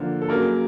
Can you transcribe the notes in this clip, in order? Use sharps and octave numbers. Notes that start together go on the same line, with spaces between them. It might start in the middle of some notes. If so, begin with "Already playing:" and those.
Already playing: D3 F3 A#3
A4
C#3 F#3 A#3 A#4